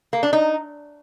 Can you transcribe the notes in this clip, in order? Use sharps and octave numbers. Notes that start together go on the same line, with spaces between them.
A#3
D4
D#4